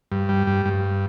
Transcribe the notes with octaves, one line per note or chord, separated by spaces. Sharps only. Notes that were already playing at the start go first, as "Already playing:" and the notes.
G2
G3
G2
G2